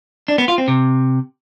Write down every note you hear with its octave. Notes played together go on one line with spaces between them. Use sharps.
D4
B3
F4
C4
C3